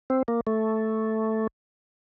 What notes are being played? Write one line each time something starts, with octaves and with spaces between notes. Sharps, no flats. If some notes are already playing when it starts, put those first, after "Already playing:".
C4
A#3
A3